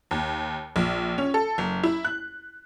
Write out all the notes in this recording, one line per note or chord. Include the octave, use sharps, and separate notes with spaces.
D#2
A#1
C#4
A4
F#1
E4
F#6